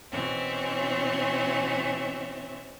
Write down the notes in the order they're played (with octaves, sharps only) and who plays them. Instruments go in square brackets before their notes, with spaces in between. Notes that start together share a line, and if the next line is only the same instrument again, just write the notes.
[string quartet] B2 E3 C4 C#4 E5